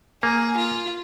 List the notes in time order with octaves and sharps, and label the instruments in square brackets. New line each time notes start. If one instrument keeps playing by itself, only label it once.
[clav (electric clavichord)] A#3 [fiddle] G#4
[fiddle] F4